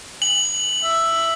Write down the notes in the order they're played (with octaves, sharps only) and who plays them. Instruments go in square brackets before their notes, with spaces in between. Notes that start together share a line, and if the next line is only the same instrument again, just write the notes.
[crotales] F#7
[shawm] E5